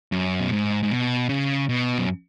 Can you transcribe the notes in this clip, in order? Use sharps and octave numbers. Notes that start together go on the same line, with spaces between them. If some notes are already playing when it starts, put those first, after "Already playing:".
F#2
B2
G#2
G#2
B2
C#3
B2
F#2